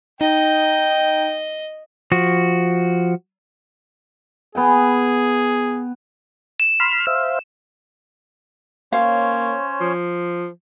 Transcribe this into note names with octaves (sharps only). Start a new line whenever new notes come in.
D#4 D#5 G5
F3 F#4
B3 G#4 G5 G#5
E7
B5 C6 F6
C5 E5 F5
A#3 C#4 C5 C#5 F5
F3